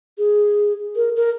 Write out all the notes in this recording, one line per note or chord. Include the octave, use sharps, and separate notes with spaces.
G#4
A#4
A#4